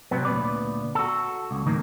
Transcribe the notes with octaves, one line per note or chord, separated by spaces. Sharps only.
C3 F#3 B3
D2 A#2 B3 B4 D5
F#4 A4
C#2
A2 D#3 F#3 A#3